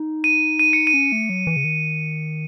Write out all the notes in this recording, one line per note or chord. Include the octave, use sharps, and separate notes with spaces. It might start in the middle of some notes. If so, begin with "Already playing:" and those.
Already playing: D#4
D#7
D#7
C#7
D#7
C#4
A3
F#3
E3
C#3
D#3